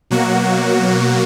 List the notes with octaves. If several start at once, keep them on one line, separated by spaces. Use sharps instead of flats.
B2 F#3 A#3 F#4